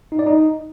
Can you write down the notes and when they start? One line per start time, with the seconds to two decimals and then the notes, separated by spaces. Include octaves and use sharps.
0.12 D#4
0.19 D5
0.26 D#4